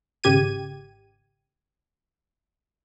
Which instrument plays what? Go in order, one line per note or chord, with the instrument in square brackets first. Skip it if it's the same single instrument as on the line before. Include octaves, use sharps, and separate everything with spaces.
[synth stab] G#1 C#3 G4 G#6 D#7